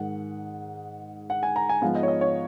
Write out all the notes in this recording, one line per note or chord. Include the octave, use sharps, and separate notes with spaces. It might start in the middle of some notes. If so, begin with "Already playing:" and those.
Already playing: G#2 D#3 G#3 F#5
F#5
G#5
A#5
G#5
G#2 F3 G#3 B3 F5
D#5
C#5
D#5
C#5